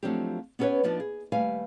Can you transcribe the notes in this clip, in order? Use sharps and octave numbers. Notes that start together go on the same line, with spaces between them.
F3 F#3 A3 C4 D4 G4
B3 C#4 G4 A4 B4 C#5
F3 B3 D4 D#4
G#4
D#2 G3 A3 B4 F5 G#5